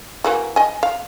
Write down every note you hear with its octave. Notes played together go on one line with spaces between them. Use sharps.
E3 A#3 F#4
D#5 G#5
F5